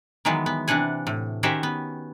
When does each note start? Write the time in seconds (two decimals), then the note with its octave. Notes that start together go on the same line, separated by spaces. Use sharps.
0.25 D#3 E3 F#3 G#3 B3
0.46 B3
0.68 C3 E3 D4 F#5 G#5
1.07 A2
1.43 D#3 C#4 F#4 G4 C5 E5
1.63 B3